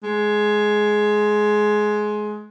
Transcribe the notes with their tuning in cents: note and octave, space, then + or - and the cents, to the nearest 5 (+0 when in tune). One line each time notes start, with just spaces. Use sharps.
G#3 +15